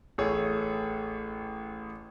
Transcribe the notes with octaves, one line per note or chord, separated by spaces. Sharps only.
A1 A3 G#4 C#5